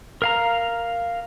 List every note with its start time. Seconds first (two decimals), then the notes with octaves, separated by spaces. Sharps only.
0.22 A#4 F5 A#5